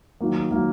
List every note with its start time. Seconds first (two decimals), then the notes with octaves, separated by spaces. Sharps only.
0.21 D#3 F#3 A#3
0.51 D#3 F#3 A#3